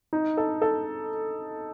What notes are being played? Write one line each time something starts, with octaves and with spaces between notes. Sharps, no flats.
D#4
A4
A4